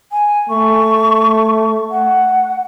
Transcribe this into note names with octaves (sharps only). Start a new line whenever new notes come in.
G#5
A3 C#6
F#5